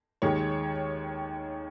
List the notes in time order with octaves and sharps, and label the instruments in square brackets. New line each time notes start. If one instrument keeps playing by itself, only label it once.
[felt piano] D#2 D#3 G#3 C#5